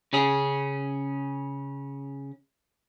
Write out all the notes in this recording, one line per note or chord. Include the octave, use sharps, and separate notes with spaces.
C#3 C#4 G#4